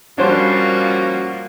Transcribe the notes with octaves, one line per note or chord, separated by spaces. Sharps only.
F3 G3 A#3 C#4 D4 F#4 C5